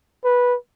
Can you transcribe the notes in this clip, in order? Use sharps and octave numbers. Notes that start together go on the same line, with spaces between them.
B4